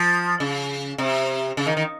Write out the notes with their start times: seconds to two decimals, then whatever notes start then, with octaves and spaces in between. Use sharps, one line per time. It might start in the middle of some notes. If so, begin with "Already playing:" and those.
Already playing: F3
0.40 C#3
0.98 C3
1.57 C#3
1.66 D#3
1.77 D#3